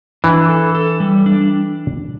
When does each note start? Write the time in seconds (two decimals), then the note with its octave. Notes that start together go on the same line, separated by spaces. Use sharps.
0.24 E3 D4
0.49 A4
0.75 A4
1.00 G3
1.26 D4